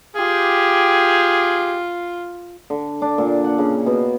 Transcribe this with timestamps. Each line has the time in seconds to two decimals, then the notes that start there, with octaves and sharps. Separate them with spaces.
0.16 F4 G4 G#4
2.70 D3
3.02 D4
3.18 A#2
3.44 F#5
3.58 C#3
3.86 B2